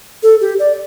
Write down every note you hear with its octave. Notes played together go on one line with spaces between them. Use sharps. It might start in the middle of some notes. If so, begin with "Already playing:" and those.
A4
G4
D5